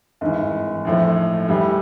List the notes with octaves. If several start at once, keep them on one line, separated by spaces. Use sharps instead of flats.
G#1 G2 E3
A#1 A2 F3 A3
A2 E3 G3